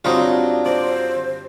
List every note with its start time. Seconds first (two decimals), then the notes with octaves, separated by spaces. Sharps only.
0.05 G2 F#3 C4 D4 D#4 F4
0.66 C5 D5